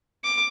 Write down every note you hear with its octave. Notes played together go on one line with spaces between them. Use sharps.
D6